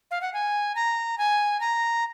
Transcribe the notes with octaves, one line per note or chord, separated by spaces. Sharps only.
F5
F#5
G#5
A#5
G#5
A#5